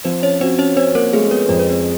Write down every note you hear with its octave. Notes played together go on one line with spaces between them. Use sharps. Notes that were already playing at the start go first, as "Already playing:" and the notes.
F3 C4 C5
C#4 C#5
C4 F#4 C5
C#4 C#5
C4 C#4 C5
A#3 A#4
G#3 A3 A4
B3 B4
F2 C5
B4
C4 C5